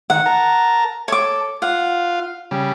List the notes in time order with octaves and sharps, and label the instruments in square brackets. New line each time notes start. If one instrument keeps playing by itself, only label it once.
[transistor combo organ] D#3 [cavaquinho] F#5
[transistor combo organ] A#4 A5 A#5
[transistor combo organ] A4 [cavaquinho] C#5 D6
[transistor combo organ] F4 F5 [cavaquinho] F#5
[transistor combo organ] C#3 G3